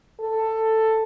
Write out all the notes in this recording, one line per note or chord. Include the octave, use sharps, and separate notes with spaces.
A4